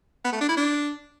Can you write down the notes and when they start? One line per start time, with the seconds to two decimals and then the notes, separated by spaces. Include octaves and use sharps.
0.24 B3
0.32 A3
0.41 D4
0.49 E4
0.57 D4